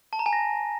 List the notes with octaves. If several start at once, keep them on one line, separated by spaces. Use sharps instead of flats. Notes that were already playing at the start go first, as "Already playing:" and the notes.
A5
A#5
G#5
A#6